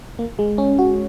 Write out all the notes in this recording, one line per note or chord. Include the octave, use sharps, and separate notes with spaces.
A#3
G#3
C#4
F#4